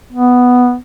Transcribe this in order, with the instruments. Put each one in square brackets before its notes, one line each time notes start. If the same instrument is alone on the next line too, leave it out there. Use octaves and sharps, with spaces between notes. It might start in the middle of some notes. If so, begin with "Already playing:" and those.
[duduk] B3